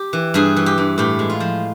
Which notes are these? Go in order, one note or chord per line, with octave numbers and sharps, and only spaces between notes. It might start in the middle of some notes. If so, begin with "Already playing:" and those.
Already playing: G4
E3
G2 G#4
E3
G4
G2
A2 G4
G#3
F4
F3